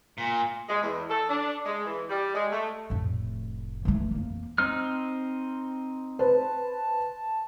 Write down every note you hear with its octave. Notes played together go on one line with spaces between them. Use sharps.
A#2
G#3
E2
A4
D4
G#3
E3
G3
G#3
A3
F1 A2
E3 A3
F2 A#3
C4 D#4 F6
B4 C5 A5